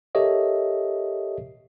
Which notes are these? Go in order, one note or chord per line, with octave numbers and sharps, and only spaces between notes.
G4 A4 A#4 C#5 D#5 E5